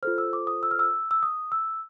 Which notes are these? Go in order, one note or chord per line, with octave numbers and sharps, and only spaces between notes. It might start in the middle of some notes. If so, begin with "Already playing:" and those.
F4 A4 C5 F6
E6
D6
D#6
E6
F6
E6
E6
D#6
E6